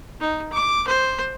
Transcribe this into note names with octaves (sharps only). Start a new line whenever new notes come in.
D#4
D6
C5